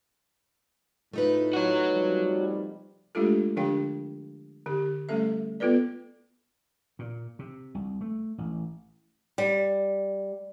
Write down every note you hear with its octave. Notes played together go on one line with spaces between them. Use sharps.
A2 A3 D#4 F4 B4
F#4 C#5
C3 F3 G3
G#3 A3 D4 F4 G4 A4
D3 F3 D4 G4 F5 G5
D3 G4
G3 A3 C#4 A4 E5
B3 F4 A4 B4 D5
A#2
C3
C2
A3
A1
G3